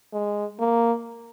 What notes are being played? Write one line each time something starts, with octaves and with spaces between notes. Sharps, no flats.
G#3
A#3